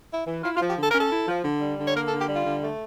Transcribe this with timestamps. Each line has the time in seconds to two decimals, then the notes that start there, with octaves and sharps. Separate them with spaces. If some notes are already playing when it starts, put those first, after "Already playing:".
0.10 E4
0.27 E3
0.44 E4 F4
0.56 F4
0.60 F3
0.68 G4
0.77 D3 A4
0.90 A#4
0.94 C#4
0.99 A4
1.11 E4
1.28 F3
1.44 D3
1.61 G3
1.78 D3
1.86 C#5
1.95 A#3 A#4
2.07 A4
2.11 D3
2.20 G4
2.29 G3 F4
2.46 D3
2.62 A3